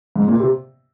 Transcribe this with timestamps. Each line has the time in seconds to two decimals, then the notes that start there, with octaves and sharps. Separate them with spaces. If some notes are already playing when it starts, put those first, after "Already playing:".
0.16 G#2
0.28 A#2
0.40 C3